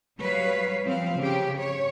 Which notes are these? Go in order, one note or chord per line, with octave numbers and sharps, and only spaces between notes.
F#3 G3 B4 C#5 F5
F3 C4 F5
C#3 G4
C#5